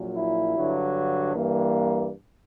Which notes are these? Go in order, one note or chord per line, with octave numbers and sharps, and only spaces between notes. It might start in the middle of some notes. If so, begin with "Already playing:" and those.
Already playing: A#1 A#2 F#3
E4
G2 D3 F#3
G2 E3 G3 A#3